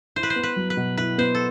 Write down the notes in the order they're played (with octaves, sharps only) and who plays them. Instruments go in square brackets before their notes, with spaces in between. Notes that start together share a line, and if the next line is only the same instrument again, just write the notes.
[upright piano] E4 [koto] C5
[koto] B4
C5
[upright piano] B3
[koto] B4
[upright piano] F#3
[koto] B4
[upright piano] B2
[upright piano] E4 [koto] B4
[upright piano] B3 [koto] C5
[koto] A4